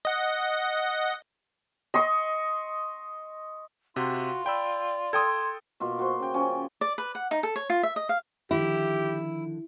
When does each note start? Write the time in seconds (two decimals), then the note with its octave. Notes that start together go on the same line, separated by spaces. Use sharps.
0.05 D#5 F#5
1.94 D#5 C6 C#6
3.96 C3 F4 F#4 C5
4.46 D5 G5 B5 E6
5.13 A4 G5 C6 D#6 G#6
5.80 B2 A#3 F4
5.99 F#4 C5
6.20 C#3 G5
6.34 F3 C#4 G5 G#5
6.81 D5
6.98 B4
7.15 F#5
7.31 D#4
7.43 A4
7.56 C#5
7.70 F4
7.83 E5
7.96 D#5
8.09 F5
8.51 D3 D#3 F3 E4 G4